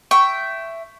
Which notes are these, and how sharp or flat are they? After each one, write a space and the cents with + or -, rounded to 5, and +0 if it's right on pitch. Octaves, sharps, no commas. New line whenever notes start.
E5 +10 G5 -15 C#6 +0